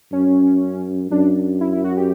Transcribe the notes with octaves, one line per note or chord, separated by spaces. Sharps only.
F#2 C#4
F#2 D4
E4
E4
F#4
G4